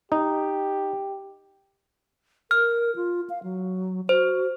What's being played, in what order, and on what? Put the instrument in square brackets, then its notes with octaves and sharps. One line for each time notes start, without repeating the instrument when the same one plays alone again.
[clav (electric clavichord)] D#4 [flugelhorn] G4
[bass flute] A#4 [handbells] F6
[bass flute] F4
F5
F#3
[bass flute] F#4 [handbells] C5